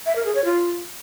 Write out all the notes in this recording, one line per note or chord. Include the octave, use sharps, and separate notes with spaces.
E5
A#4
G#4
C#5
F4